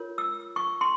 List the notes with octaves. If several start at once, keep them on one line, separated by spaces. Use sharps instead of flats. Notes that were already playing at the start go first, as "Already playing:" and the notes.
Already playing: F4 A#4 C#5
E6
C#6
C6